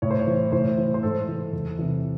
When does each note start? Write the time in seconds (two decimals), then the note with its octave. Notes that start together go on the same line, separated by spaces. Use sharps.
0.02 A2 C#5
0.11 C5
0.19 C#5
0.27 E3
0.52 A2 C5
0.78 E3
0.94 C5
1.03 G#2 A4
1.28 E3
1.53 E2
1.79 C3 E3